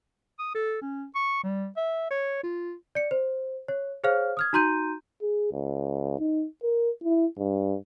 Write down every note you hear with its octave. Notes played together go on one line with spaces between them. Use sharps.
D#6
A4
C#4
C#6
G3
E5
C#5
F4
D5 C#7
C5
C#5
G#4 C5 C#5 F5 F6
D#6 F6 G#6
D#4 F#4 A#5 C6 G6 D#7
G#4
C#2
D#4
A#4
E4
G2